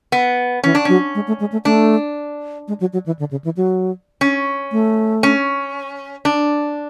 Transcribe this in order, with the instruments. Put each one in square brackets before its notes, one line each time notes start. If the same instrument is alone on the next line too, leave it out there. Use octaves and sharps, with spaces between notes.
[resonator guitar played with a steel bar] B3
[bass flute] E3 [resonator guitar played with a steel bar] C#4
[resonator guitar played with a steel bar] D4
[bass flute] F#3 [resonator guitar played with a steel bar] C#4
[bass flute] G#3
A3
G#3
A3
[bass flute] A3 [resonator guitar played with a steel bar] D4
[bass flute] G#3
F#3
F#3
E3
D3
C#3
E3
F#3
[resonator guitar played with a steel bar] C#4
[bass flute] A3
[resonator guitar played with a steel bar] C#4
D4